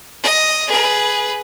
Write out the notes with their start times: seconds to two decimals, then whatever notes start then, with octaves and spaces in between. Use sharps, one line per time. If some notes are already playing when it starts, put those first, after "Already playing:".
0.23 D#5
0.67 G#4 B4